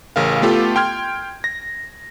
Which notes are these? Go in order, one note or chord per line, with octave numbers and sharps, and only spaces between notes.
A1 C#3 A#4 F5
A3 B3 F4 G4 A4
G5 C6 F6 G#6
A#6